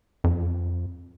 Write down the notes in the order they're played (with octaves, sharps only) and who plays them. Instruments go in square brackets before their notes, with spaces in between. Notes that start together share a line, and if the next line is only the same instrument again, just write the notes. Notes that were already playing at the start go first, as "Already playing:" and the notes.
[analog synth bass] F2